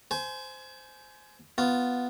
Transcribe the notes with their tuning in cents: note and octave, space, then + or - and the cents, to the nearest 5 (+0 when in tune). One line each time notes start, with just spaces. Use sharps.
C5 -10 G#5 +25
B3 +0 F4 +0